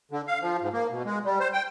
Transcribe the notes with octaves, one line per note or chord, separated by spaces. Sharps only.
D3
F5
F3
G#2
A#3
B2
G#3
G3
C5
G5